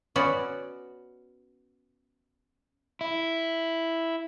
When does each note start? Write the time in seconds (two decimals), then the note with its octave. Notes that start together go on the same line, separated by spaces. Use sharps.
0.16 B3 C#4 F#4 D5
3.01 E4